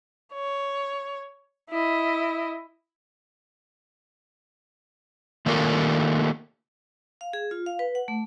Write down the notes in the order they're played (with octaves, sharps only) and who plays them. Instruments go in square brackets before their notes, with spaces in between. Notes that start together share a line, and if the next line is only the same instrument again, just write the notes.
[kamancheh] C#5
E4 D#5
[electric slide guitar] D#3 A3 A#3 D4 F4 A#4
[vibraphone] F5
G#4
F4
F5
B4
F#5
A3